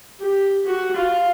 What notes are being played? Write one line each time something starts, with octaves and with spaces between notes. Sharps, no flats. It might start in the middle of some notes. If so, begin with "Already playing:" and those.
G4
F#4
F4